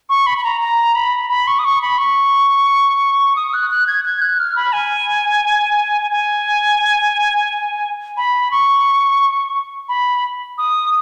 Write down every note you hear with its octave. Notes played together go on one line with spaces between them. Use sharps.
C#6
B5
B5
A#5
A#5
B5
B5
C#6
D#6
C#6
B5
C#6
D#6
F#6
F#6
G#6
G#6
F#6
F6
B5
G#5
G#5
B5
C#6
B5
D#6